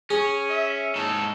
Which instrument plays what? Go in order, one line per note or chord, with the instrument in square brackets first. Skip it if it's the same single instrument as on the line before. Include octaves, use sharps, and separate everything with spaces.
[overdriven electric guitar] C#4 [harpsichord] G#4
[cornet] E5
[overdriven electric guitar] G#2 A4 [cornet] D#4